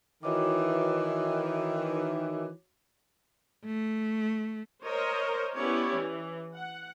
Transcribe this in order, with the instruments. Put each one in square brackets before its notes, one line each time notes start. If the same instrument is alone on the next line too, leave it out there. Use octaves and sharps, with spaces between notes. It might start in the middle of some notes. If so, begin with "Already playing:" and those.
[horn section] D#3 E3 [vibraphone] F#4 C#5 D6
[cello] A3
[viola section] A#4 C5 C#5 D#5
B3 C#4 E4 G4 C#5 D5
E3
F#5